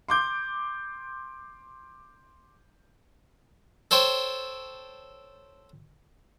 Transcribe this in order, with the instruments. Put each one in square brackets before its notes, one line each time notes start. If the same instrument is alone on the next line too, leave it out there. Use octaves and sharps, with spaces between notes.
[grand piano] C6 D6 G6
[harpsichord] A4 C5 C#5 G5